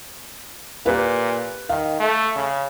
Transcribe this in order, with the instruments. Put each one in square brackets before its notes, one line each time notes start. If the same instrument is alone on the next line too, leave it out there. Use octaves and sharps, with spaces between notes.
[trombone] A#2 [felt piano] G4 B4
[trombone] D#3 [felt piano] F5
[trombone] A3
C#3